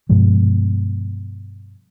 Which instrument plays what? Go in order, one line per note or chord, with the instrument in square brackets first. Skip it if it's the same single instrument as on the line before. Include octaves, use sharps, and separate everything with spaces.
[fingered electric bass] G2 B2 F3 G#3